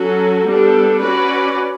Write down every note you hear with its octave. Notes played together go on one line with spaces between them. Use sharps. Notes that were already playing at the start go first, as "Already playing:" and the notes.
Already playing: F#3 C#4 F#4 A4
G3 B3 D4 A4
C#4 F#4 B4 D5